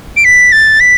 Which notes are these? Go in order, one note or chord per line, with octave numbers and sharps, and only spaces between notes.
D7
B6
A6
B6